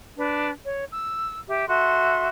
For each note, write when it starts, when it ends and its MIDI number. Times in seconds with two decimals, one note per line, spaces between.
0.17 0.50 62
0.17 0.50 71
0.63 0.82 73
0.91 1.36 88
1.48 1.64 67
1.48 1.64 76
1.67 2.27 66
1.67 2.27 69
1.67 2.27 76
1.67 2.27 84